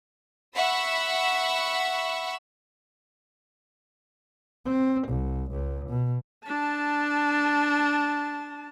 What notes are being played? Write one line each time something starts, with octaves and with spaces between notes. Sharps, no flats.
E5 F#5 B5 C#6 E6
C4
C2
C#2
B2
D4 A5